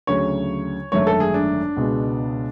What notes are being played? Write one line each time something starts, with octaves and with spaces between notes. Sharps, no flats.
D2 C#3 F#3 C#5
G#1 F#2 D3 A3 C#5
A4
G#4
D4
C#2 B2 G#3 B3